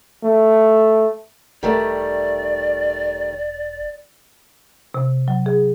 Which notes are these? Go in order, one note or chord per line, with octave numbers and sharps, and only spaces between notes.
A3
E1 D#3 G3 A3 D5
C3
F#3
G#4